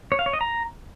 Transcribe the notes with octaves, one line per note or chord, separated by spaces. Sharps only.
C#5
F5
C#5
D#5
A#5